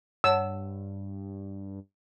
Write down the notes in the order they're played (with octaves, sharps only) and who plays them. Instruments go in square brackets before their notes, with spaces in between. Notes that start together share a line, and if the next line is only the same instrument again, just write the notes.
[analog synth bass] G2 [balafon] C#5 F#5 A5 [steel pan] E6